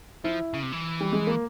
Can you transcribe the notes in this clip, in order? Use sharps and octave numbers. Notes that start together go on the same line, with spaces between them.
F3 E4
C#3
C3
E3
G3
G#3
A#3